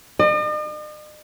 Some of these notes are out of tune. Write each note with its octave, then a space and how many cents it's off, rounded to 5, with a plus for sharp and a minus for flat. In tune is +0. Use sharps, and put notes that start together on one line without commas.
D#5 -45